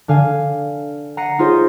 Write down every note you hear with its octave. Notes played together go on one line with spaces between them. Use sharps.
D3 F5 G#5
F#5 A#5 A#6 C7 C#7 D#7
D#4 F4 G#4 C5 C#5 D#5